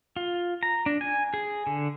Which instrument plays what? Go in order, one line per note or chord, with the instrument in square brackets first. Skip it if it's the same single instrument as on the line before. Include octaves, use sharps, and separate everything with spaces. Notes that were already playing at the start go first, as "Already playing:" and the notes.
[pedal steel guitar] F4
A#5
D4
G#5
G#4
D3